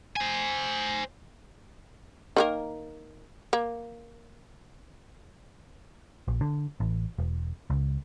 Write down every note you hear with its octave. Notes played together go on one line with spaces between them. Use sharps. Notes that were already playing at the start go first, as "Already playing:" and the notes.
C5 G#5
D#3 A#3 A#4
A#3
A#1
D3
A1
E1
C#2